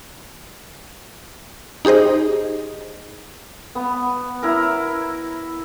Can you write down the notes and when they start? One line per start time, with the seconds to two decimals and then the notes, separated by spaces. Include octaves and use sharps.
1.85 D#4 G4 G#4 C5 D#5
3.75 B3
4.43 E4 A#4